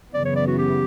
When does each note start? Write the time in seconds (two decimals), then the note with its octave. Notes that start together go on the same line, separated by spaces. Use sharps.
0.14 F#2 C#3 E3 B3 D5
0.25 C#5
0.36 D5
0.47 F#4
0.59 G4